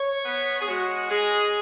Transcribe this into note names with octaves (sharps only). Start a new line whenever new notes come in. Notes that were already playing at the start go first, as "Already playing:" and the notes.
Already playing: C#5
B3
G#4
G#3 F#4
G#3 G#4